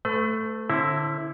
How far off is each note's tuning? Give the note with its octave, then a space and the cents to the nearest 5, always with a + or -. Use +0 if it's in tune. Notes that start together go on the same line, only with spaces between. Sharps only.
A3 +0 B4 +40
D3 +5 C4 +45 E4 +0